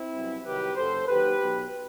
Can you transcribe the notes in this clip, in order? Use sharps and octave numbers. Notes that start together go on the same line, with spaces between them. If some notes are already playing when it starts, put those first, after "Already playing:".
Already playing: C4 E4
C2 B2 F#3
C2 C3 D#3 F#3 G4 B4
F#1 F#2 F#3 A4 C5
D#2 D#3 F#3 G4 B4
B1 B2 F#3